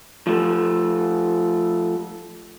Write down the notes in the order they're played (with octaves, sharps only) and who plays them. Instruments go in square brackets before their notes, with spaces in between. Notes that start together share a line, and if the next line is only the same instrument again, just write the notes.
[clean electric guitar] F3 A3